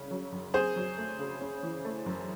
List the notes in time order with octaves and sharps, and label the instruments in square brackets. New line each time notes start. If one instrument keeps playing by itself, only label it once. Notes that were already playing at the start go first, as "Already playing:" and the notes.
Already playing: [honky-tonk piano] C2 C#3 C#4
F#3
F#2
[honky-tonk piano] C4 [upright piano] G#4 C5
[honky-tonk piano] F#3
A3
C#3
C#4
E3
A3
F#2